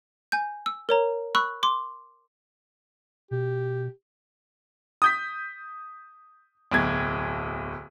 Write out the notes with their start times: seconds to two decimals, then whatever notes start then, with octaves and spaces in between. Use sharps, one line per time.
0.32 G#5 G6
0.66 E6
0.89 A#4 C#5 A#5
1.35 B5 C#6 E6 F#6
1.63 C6 D6
3.31 B2 G4
5.02 D#6 G6 B6
6.72 D1 B1 G#6